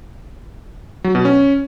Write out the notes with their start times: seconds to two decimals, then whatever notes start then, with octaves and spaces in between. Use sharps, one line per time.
1.04 F#3
1.15 B2
1.25 C#4